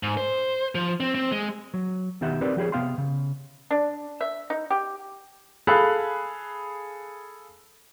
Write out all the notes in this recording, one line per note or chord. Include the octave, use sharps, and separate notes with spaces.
G#2
C5
F3
C4
C4
G#3
F#3
B1 D#3 B3 G4 E5 F#5
C4 D#4 G4 A#4 B4 D5
F3 G4 G#4 C#5
C3 B3 F5 G5 C6
C#3
D4
E5
D#4
G4
G#4 A4 F5 B5 F#6